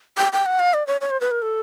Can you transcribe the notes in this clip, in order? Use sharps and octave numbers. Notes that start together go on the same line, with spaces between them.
G5
G5
F#5
F5
D5
C#5
C#5
C5
B4
A#4
A4